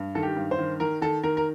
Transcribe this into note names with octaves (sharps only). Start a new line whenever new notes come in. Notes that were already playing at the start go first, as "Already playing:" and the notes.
Already playing: G2
D#3 A4
G4
G2
C5
D#3
D#3 A#4
D#3 A4
D#3 A#4
A#4